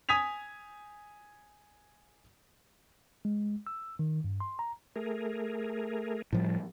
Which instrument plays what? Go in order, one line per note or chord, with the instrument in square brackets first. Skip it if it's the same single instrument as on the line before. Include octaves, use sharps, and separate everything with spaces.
[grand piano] G#5 D#6 G#6 B6 F7
[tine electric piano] G#3
E6
D#3
G2
C6
A#5
[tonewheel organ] A3 G#4 A#4
[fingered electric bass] A2 F3 G3